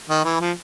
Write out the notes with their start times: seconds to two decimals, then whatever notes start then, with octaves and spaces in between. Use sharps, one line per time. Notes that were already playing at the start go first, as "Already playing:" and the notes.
0.10 D#3
0.25 E3
0.40 F3